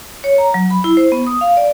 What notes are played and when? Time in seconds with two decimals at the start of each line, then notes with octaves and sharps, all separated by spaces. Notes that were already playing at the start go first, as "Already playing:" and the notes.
0.24 C#5
0.38 A#5
0.54 F#3
0.70 B5
0.84 E4
0.97 C5
1.12 B3
1.27 D#6
1.41 F5
1.57 D5